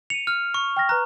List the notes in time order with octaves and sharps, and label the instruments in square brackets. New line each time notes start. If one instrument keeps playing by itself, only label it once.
[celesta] C#7 D#7 [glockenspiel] F7
[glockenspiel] F6
C#6
[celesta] G5 F6 A#6
[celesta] B4 F6 F#6 [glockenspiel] A#5